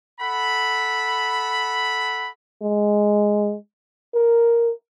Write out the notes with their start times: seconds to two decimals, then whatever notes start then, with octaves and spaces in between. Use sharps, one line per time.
0.21 A4 F#5 B5
2.62 G#3
4.15 A#4